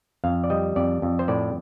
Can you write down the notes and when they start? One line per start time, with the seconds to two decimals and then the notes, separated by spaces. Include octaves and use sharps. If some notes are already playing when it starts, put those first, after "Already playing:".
0.24 F2 F5
0.44 D5
0.50 G3 D#5
0.76 F2 D5
1.02 F2
1.19 C5
1.28 A2 D5